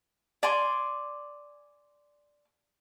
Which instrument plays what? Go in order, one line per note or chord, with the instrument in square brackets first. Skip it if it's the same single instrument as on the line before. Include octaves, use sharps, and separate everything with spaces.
[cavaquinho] D5 G#5 C6 D6